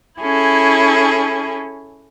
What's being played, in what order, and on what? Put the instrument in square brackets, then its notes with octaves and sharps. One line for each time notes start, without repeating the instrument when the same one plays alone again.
[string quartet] C#4 E4 G#4 A4